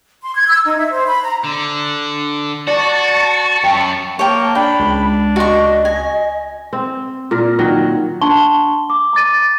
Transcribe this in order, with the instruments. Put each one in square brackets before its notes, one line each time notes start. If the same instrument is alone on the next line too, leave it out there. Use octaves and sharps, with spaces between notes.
[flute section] C6
G#6
E6
D#4
E5
C5
B5
A#5
[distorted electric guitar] D3
[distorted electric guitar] F#4 [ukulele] D5 [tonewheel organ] A5 C#6
[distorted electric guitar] F#2 [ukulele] G5
[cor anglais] A#3 [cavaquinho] C#5 G5 [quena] A5
[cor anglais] D4 [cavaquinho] G5 [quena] B5
[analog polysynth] C#2
[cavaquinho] F#4 C#6 [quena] D#5
[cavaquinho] G#5
[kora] C4
A#2 A#4
D#3 F#3
[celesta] D4 F#5 A5 C6 C#6 G7
D6
A#5 D6 A6 D#7